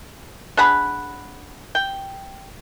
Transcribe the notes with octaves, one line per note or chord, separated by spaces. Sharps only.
D4 G#4 F#5 B5
G5